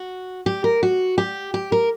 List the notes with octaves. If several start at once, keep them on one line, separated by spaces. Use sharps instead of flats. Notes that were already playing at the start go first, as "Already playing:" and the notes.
Already playing: F#4
G4
A#4
F#4
G4
G4
A#4